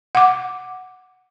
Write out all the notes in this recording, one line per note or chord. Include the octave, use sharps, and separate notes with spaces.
F#5 D6